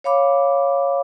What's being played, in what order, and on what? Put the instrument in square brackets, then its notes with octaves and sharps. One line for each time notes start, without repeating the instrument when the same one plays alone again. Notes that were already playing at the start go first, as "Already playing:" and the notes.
[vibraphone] C#5 F5 B5 D6